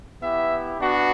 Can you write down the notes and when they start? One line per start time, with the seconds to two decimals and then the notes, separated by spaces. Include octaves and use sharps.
0.21 B3 E4 G4 E5
0.79 B3 D4 F#4